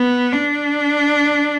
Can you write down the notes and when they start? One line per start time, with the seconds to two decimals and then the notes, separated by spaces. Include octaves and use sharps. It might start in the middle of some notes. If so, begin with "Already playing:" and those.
Already playing: B3
0.32 D4